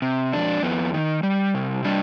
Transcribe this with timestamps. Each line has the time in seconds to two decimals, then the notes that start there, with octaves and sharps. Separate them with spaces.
0.02 C3
0.32 F2 D4
0.63 F2 B3
0.94 D#3
1.23 G3
1.54 C3
1.84 G3 D4